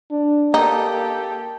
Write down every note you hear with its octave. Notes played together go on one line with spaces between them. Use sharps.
D4
A#3 D#4 G4 A4